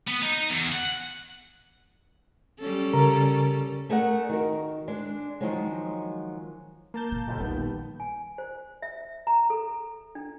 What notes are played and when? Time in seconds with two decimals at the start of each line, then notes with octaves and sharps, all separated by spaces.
0.07 B3
0.22 D#4
0.50 E2
0.72 F#5
2.60 G3 C#4 A4
2.94 C#3 A#4 A#5
3.89 A3 G#4 A#4 D5 F#5
4.29 D#3 F#4 A#4
4.88 G#3 D4
5.41 D#3 F3 F#3 G#3
6.94 A#3 A5 G6
7.12 A#2
7.28 G1 D#2
7.40 A#1 D#3 G3 B3
8.00 G#5
8.38 C5
8.82 E5
9.27 A#5
9.50 A4
10.15 D4